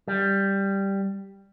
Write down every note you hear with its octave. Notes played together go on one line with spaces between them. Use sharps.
G3